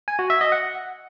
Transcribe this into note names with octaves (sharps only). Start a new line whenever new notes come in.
G#5
F#4
E5
D#5
F#5